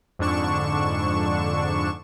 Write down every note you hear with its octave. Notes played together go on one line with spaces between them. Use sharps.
F2 G#2 D3 D4 C#6 E7